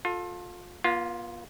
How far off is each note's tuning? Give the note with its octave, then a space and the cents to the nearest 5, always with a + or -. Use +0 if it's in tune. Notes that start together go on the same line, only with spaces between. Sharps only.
F4 +25 A4 +0
B3 -45 F4 +0